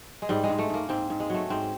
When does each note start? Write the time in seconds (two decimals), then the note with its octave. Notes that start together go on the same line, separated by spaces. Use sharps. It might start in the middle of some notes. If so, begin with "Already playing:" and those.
0.22 G#3
0.29 G#2 G3
0.44 G#3
0.50 G#2
0.59 A3
0.69 G#2 A#3
0.89 G#2 C4
1.10 G#2
1.20 G#3
1.30 F#3 A3
1.50 G#2 C4